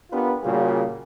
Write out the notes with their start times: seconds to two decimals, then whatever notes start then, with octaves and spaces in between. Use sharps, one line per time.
0.11 B3 D4 F4 G4 A#4 B4
0.43 A#2 C#3 G3 F4 F#4 G#4